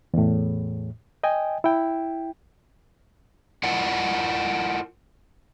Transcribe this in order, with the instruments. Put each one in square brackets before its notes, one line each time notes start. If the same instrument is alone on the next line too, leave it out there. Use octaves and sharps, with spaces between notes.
[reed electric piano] E2 A2
D#5 G5 G#5
E4 G5
[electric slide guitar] E4 F4 A#4 D5 F#5